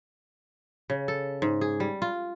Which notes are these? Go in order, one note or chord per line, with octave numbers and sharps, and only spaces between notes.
C#3
A4
G#2
G#4
G3
F4